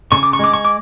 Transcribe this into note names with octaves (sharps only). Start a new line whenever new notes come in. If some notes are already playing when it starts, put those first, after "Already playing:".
C#3 C#6
D6
C#6
G#3 D6
C#6
D6